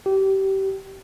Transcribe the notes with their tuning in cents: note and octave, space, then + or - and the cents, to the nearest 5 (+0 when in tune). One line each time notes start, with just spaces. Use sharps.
G4 -25